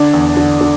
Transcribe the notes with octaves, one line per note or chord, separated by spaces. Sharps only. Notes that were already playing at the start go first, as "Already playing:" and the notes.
Already playing: D3 D4
E2
D3
D3